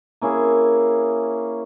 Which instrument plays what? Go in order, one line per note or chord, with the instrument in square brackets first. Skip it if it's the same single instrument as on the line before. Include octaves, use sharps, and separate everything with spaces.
[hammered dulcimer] A#3 C#4 E4 G#4